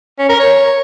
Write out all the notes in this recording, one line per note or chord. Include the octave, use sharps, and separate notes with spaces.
C#4
A#4
C#5